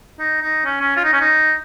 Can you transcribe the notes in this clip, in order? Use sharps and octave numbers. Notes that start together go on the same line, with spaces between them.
D#4
D#4
C#4
C#4
F4
D#4
C#4
D#4